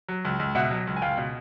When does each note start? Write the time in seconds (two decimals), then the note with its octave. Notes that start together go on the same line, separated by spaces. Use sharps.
0.09 F#3
0.25 C#2
0.39 C#2
0.55 B2 E5 F#5
0.71 F#3
0.87 C#2
0.96 G#5
1.02 C#2 F5 G5
1.18 B2